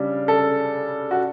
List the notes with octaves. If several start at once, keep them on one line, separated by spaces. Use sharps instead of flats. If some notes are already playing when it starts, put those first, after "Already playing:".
Already playing: C#3 G3 D4
A4
F#4